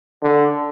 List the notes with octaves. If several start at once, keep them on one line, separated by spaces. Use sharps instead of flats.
D3